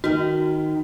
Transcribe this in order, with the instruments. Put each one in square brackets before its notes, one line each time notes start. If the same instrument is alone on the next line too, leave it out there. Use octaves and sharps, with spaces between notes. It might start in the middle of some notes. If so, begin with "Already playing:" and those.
[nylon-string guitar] D#3 D#4 [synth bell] F#4